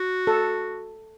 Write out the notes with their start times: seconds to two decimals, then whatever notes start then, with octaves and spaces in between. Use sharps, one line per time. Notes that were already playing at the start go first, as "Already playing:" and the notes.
Already playing: F#4
0.27 A4